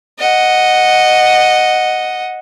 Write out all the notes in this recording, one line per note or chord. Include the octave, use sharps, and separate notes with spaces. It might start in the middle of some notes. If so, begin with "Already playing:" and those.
D#5 F#5